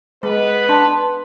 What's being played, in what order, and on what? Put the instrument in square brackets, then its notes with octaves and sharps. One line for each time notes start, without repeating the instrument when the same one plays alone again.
[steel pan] G#3 [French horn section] B3 B4
[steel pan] D4 [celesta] A5 C6